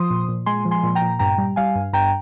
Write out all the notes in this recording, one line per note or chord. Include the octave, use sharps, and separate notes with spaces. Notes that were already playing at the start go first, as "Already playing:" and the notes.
Already playing: F3 C6 D#6
A#2
A#2
G#3 G#5 C6
F3
G#5 C6
A#2
G5 A#5
A#2
G2 G5 A#5
G3
G3 F5 G#5
G2
G2 G5 A#5